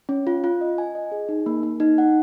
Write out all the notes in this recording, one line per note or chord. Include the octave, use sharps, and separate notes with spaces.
C#4
F4
F4
D#5
G#5
D#5
G#4
D#4
A#3
A#3
D#4
F#5